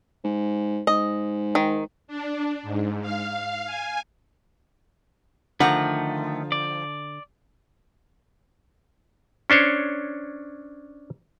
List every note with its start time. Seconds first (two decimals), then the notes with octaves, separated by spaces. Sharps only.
0.24 G#2
0.87 G#2 D#5
1.55 D#3
2.07 D4
2.63 G#2
3.01 F5
3.65 G#5
5.60 D3 D#3 F3 A3 F#5 A#5 D6
6.52 D5
9.50 C#4 D4 C5 C#5